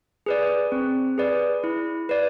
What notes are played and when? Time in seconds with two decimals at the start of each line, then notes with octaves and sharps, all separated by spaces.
0.26 G#4 B4 D5
0.72 C4
1.18 G#4 B4 D5
1.64 E4
2.09 B4 D5